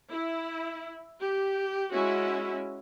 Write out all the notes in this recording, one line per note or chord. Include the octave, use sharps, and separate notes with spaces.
E4
G4
G#3 C#4 E4 F#4